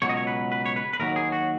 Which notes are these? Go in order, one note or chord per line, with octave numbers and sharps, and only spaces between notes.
C#2 B2 F#3 C#5
D#5
C#5
B4
B4
C#5
B4
B4
D#2 D#3 F#3 A#4
G#4
F#4